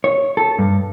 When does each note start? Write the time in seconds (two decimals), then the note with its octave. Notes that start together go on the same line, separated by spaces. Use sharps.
0.04 C#5
0.37 A4
0.59 G2